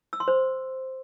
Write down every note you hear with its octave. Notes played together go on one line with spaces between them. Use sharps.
E6
C6
C5